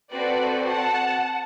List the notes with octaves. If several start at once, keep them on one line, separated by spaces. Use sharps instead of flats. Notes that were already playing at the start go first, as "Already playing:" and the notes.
C4 F#4 A4 B4 D5
F#5 A5